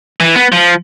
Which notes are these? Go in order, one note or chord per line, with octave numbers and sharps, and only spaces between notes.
E3
B3
F3